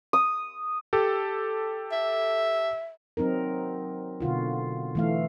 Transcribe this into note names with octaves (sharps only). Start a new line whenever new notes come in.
D#6
G4 A4
E5
F#3 C4 D#4 A#4
B2 D3 F4 F#4
E3 A3 F5